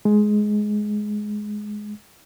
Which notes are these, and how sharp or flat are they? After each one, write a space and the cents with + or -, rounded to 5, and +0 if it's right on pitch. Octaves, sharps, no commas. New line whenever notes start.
G#3 +10